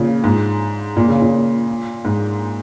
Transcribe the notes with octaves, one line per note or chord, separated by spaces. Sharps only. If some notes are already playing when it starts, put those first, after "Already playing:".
Already playing: A#2 C#3 F3
G#2
A#2
C#3
A#2
G#2